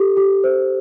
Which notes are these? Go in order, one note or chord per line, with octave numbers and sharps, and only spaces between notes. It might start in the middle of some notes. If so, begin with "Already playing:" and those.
Already playing: G4 A4
G4
C5